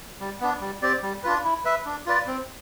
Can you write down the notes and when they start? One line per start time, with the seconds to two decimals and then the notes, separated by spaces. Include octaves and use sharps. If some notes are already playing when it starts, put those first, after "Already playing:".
0.20 G3
0.40 B3 D4
0.61 G3
0.82 C4 G4 D5
1.03 G3
1.23 D4 F4 B4
1.44 E4
1.65 B4 E5
1.86 D4
2.06 F4 B4 D5
2.27 C4